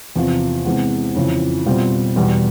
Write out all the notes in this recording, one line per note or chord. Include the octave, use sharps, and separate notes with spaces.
E2 C3 F3
C3 E3 G#3 B3
F2 C#3 E3
B2 G3 C4 F4
E2 B2 G3